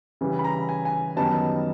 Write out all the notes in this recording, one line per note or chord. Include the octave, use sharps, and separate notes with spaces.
C#3 E3 G3
B5
A#5
G#5
G#5
F#2 D#3 G3 B3 D#4 A5